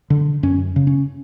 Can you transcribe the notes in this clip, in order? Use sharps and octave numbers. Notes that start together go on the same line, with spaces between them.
D3
F#2 C#4
C#3
C#4